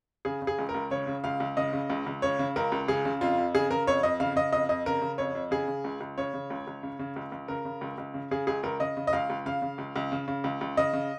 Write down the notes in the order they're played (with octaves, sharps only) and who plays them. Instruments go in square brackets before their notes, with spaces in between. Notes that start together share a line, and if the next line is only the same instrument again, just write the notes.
[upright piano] C#3 G#4
C#3
G#4
C#2
A#4
C#2
C#3 C#5
C#3
C#2 F5
C#2
C#3 D#5
C#3
C#2
C#2
C#3 C#5
C#3
C#2 A#4
C#2
C#3 G#4
C#3
F2 F4
F2
C#3 G#4
C#3 A#4
F2 C#5
F2 D#5
C#3 F5
C#3 D#5
F2 D#5
F2 D#5
C#3 A#4
C#3
F2 C#5
F2
C#3 G#4
C#3
C#2
C#2
C#3 C#5
C#3
C#2
C#2
C#3
C#3
C#2
C#2
C#3 A#4
C#3
C#2
C#2
C#3
C#3 G#4
C#2 G#4
C#2 A#4
C#3 D#5
C#3
D#5
C#2 F5
C#2
C#3 F5
C#3
C#2
C#2
C#3
C#3
C#2
C#2
C#3 D#5
C#3